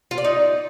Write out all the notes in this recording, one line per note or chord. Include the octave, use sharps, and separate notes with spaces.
F4
D5
D#4